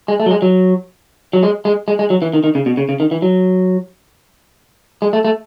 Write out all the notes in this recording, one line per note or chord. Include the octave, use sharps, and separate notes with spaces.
G#3
A3
F#3
G#3
F#3
F#3
G#3
G#3
G#3
G#3
F#3
E3
D#3
D#3
C#3
B2
C#3
C#3
D#3
E3
F#3
G#3
A3
A3